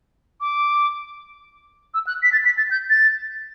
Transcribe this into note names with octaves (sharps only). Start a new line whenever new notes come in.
D6
E6
F#6
B6
A6
B6
A6
G6
A6